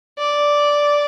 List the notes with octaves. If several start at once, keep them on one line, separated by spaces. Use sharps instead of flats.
D5